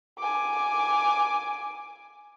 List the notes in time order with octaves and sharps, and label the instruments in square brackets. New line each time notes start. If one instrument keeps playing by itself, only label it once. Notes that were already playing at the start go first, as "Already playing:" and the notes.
[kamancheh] G#5 D6